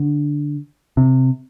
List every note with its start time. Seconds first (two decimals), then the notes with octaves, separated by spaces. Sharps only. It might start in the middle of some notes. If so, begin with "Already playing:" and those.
Already playing: D3
0.97 C3